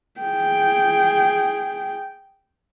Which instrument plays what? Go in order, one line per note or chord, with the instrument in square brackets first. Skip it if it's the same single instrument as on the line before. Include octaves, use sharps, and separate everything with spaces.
[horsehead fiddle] G#4 G5